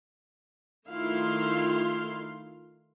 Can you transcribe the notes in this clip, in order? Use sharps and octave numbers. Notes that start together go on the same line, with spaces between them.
D#3 A3 E4 F4 F5 C6